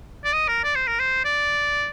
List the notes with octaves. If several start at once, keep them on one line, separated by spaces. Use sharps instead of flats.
D5
D#5
A#4
D5
C5
A#4
C5
D5